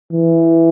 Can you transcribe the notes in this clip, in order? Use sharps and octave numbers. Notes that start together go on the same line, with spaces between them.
E3